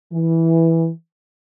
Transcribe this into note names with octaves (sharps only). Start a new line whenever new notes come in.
E3